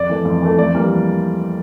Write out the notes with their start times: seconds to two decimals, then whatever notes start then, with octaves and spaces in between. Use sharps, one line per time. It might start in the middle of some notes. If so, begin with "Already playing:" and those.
Already playing: F2 D5
0.09 E3 A3
0.25 F2
0.42 E3 A3
0.58 F2 D5
0.74 E3 G3 A#3